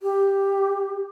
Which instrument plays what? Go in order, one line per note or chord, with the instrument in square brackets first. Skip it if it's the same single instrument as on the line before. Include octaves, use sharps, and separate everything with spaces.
[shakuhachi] G4